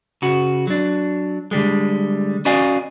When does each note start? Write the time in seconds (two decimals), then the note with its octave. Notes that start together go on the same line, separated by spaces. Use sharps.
0.22 C#3 F#4
0.67 F#3 D4
1.51 D3 G3 G#3
2.45 C#4 F#4 D5 D#5 F5 G#5